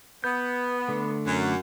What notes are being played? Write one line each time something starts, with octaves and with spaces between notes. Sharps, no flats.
B3 G6
D3 A3
F#2